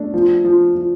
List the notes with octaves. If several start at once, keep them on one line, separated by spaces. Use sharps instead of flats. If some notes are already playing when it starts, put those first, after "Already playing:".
Already playing: A3 D4
F3
F3
F3